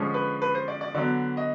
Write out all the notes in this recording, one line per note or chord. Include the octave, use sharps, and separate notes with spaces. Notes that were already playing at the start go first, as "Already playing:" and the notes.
Already playing: D3 F3 G#3 C#4
B4
B4
C5
D5
D5
D3 F#3 B3 D5
D#5